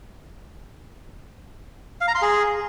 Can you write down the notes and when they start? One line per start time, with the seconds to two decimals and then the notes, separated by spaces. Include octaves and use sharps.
2.01 F5
2.08 A#5
2.15 C6
2.22 G#4